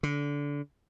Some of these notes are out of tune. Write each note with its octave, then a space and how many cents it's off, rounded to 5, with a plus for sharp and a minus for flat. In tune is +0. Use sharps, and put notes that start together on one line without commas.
D3 -25